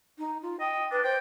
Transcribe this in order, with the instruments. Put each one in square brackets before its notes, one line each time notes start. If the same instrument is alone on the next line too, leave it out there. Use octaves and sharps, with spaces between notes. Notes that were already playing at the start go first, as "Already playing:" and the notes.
[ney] D#4
F4
[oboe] D#5 [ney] G5
[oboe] D4 [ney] B4
[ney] C5 [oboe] G5